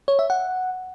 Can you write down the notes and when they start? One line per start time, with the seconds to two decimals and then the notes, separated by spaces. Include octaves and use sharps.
0.08 C#5
0.19 E5
0.30 F#5